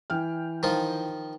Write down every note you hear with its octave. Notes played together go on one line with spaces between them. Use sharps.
E3 G5 F6
D#3 F3 F4